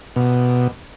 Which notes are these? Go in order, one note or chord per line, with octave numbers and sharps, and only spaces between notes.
B2